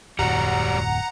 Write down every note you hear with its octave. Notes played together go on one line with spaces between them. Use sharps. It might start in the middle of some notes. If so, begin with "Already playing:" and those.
D1 F2 G3 F#4 F#5 A#5